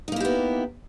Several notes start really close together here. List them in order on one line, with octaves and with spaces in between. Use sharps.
D#4 A#3 E4 G4 B3